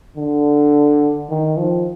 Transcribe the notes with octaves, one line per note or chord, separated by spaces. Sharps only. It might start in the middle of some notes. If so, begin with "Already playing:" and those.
D3
D#3
F3